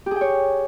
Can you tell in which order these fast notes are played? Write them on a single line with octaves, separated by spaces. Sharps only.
G4 G#4 G5 C#5